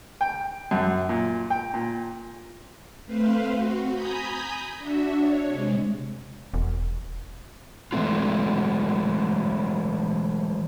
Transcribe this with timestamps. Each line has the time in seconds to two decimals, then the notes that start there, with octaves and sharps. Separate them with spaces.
0.21 G5
0.71 F#2
1.09 A#2
1.50 G5
1.74 A#2
3.06 A3 C4 B4 C5 F5
3.54 C4 F#4
3.92 G#5 A#5 B5 D#6 G6
4.78 D4 F#4 E5
5.13 D4 C#5
5.46 C3 G#3
6.54 E1
7.92 E3 F#3 G#3 A3 C4 F4